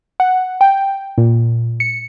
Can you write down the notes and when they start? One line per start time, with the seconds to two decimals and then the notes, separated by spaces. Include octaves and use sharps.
0.20 F#5
0.61 G5
1.18 A#2
1.80 C#7